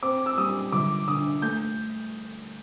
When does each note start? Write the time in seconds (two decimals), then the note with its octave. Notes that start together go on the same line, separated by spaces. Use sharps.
0.03 C4 D6
0.26 E6
0.37 G3 D#6
0.72 G1 D6
1.08 D3 D#6
1.42 A3 G6